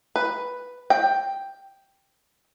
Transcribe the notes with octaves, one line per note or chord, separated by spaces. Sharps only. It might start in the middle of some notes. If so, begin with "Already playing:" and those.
B4
G5